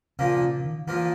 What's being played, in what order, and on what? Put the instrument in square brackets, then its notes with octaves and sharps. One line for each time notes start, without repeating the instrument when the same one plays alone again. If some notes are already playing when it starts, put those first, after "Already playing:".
[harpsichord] A#2 F3 A#3 [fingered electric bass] C#3
[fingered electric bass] C#3
D#3
[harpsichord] A#2 F3 A#3 [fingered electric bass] E3